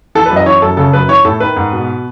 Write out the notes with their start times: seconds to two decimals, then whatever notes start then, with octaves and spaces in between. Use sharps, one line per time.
0.15 E3 A4
0.26 B4
0.30 F#2
0.36 D#5
0.46 E3 C#5
0.62 F#2 A4
0.77 C#3 A4
0.93 F#2 B4
1.08 E3 C#5
1.24 A2 A4
1.40 D#3 B4
1.56 G#2
1.72 B2